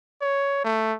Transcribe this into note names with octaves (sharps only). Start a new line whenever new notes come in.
C#5
A3